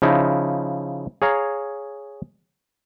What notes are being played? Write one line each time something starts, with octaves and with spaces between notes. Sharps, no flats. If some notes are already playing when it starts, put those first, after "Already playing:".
C#3 F3 D#4 E4
G#4 C#5 F5 A#5